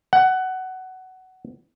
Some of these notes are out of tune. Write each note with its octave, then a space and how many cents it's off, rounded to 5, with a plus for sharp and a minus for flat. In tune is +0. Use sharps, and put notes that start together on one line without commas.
F#5 +15